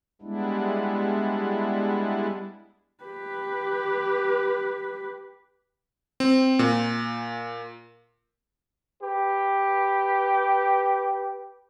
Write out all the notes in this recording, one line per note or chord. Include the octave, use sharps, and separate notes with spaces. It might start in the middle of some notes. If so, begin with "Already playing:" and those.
G3 G#3 B3 D4 E4
G4 B4
C4
A#2
G4 B4